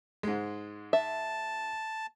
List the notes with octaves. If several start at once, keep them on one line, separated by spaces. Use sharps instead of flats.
G#2 G#3
E5 A5